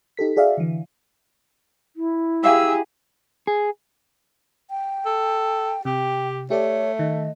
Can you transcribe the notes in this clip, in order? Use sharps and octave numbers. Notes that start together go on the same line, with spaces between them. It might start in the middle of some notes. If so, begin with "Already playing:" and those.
D#4 G4 A4 B6
F#4 G#4 D5 E5 F5
D3 E3
E4
G4 G#4 E5 F5 G#5 E6
G#4
G5
A4
C3 G4 G5
A3 G4 A4 C#5 D5
D#3 D#5